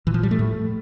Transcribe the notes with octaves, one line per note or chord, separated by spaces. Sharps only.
A#2 E3
F3
G3
A3
A2